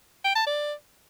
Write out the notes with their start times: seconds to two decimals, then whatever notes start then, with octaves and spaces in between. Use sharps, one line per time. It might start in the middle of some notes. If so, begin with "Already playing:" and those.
0.24 G5
0.35 A5
0.46 D5